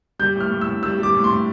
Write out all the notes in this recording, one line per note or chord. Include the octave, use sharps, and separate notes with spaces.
G3 G6
A2 F6
A2
E6
A2
G3 E6
G3 D6
A2
C6
A2